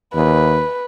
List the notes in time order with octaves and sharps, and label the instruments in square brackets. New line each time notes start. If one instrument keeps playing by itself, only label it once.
[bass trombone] D#2 [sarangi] B4